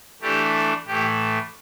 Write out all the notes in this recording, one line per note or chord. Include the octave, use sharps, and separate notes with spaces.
E3 A3 D4 G4
A2 E3 A3 G4